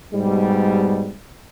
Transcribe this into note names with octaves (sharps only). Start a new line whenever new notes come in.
G#2 B2 G3